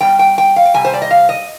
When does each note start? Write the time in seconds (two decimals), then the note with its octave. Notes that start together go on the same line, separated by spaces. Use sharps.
0.01 B2 G3 G5
0.19 G5
0.38 G5
0.56 F5
0.65 G5
0.74 C3 G3 G#5
0.85 C5
0.94 D5
1.02 D#5
1.11 F5
1.29 D#5